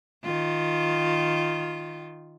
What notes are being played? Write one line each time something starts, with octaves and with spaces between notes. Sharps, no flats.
D#3 F4